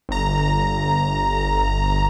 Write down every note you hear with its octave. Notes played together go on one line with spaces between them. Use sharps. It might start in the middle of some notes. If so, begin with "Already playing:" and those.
G1 A#5